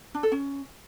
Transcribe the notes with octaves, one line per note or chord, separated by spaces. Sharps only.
D4
A4
C#4